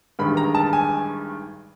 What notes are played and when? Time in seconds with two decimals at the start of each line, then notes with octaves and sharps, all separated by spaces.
0.19 A1 G2 D#3 G#3 B5
0.37 A#5
0.55 A5
0.73 G#5